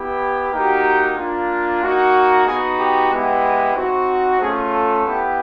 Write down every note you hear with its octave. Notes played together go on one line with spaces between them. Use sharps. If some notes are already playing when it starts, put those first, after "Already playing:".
Already playing: B3 E4 G4
A#3 D#4 F#4 G4
A#3 D4 F4
A#3 D#4 F#4
B3 D#4 F#4 G#4
G4
G#3 B3 E4 G4
C4 D#4 F#4
A3 C#4 F4 G#4
A4
B3 E4 G4